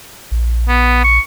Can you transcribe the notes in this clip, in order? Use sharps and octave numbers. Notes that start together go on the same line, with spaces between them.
A#1
B3
C#6